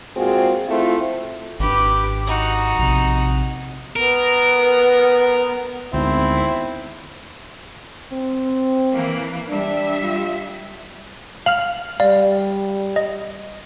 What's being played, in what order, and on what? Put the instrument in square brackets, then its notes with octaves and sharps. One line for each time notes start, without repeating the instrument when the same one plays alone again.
[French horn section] A#2 G#3 C4 F4 F#4 G#4
A3 C4 E4 F4
[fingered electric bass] G#1 D4 [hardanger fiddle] G4 B4
[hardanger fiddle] D#4 F#4
[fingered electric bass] A#1 C3
[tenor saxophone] B3 [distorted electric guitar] A#4
[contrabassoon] G#1 [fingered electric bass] D2 G#3 B3 [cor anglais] C4 [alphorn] E4
[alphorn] C4
[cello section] E3 A#3
[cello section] G3 E5 [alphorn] D4
[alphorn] F4
[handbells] F5 [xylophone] F6 F7 F#7
[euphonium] G3 [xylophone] D5 [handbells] F5
[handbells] D#5